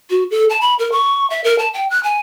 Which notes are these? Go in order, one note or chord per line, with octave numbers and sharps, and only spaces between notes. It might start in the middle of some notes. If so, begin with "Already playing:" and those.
F#4
A4
A5
B5
A#4
C#6
E5
A#4
A5
G5
F#6
G#5